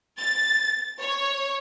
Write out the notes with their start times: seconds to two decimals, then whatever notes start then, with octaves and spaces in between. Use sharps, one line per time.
0.19 A6
0.98 C#5